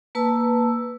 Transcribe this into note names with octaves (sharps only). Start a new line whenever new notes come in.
A#3 B4 A5 E6